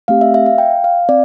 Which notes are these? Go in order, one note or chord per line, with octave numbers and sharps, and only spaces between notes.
A3 C4 G4 F5
E5
E5
F5
G5
F5
C4 D5